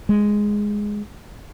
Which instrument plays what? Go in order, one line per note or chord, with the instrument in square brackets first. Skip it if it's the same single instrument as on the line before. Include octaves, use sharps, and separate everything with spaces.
[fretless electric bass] G#3